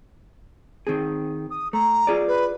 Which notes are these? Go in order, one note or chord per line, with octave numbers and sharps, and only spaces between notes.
D#3 C4 G#4
D#6
A3 A#5
F4 G#4 D5
B4